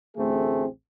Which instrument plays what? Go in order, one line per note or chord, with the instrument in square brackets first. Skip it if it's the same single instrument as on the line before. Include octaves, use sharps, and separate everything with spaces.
[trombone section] A1 D2 A3 C4 G#4